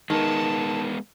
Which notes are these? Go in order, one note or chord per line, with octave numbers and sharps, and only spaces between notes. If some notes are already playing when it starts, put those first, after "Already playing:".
D#3 G#3 B3 A5